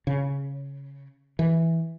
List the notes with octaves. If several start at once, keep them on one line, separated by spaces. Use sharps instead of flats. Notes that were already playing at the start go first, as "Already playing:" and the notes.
C#3
E3